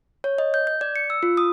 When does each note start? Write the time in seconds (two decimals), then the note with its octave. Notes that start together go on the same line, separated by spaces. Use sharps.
0.24 C#5
0.38 D#5
0.54 G6
0.67 G6
0.81 D5
0.96 C#7
1.10 E6
1.23 F4
1.37 D#6